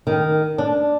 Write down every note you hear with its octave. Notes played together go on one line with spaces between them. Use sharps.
D#3
D4